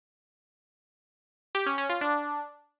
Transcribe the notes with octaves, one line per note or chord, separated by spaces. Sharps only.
G4
C#4
C#4
F4
D4